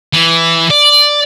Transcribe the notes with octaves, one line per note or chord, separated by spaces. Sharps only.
E3
D5